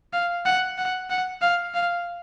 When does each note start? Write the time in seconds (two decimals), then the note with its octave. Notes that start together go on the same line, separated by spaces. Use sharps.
0.13 F5
0.45 F#5
0.78 F#5
1.10 F#5
1.42 F5
1.74 F5